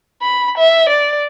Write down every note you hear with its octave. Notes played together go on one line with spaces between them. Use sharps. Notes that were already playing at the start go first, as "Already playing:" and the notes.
B5
E5
D5